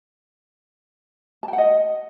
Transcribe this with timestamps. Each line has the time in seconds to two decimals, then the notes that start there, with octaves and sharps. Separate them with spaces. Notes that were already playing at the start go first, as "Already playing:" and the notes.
1.43 A5
1.48 G5
1.53 F#5
1.58 D#5